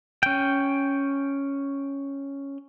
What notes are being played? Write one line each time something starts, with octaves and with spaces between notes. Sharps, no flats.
C#4 G5